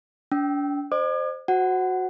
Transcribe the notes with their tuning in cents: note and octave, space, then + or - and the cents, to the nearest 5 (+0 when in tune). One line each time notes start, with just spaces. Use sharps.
D4 -40 G5 -20 E6 -15
C5 +0 D#5 -45 D6 +45
F#4 -10 C5 -5 F#5 +15